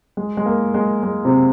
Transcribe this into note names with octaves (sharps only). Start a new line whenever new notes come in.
G#3
G#3
A#3
G#3
G#3
C3